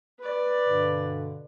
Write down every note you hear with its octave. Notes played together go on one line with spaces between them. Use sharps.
B4 D5
G2 B2 D3